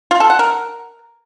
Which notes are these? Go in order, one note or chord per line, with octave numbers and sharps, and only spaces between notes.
F4
A4
F#5
A#4